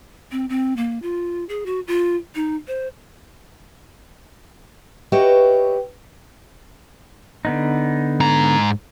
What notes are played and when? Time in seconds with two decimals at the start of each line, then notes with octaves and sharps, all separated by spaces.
0.32 C4
0.49 C4
0.77 A#3
1.02 F4
1.49 G#4
1.66 F#4
1.87 F4
2.35 D#4
2.68 C5
5.12 F#4 G4 B4 C#5 D#5 E5
7.45 D3 B3 D#4
8.20 G#2 A#5